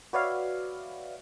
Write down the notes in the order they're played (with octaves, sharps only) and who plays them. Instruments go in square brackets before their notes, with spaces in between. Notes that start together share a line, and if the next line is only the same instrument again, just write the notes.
[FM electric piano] F#4 B4 C#5 D5 E5 F5